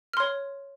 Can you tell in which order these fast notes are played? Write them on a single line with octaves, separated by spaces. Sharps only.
F6 C6 C#5